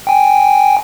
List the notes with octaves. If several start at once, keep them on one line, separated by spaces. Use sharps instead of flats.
G5 G#5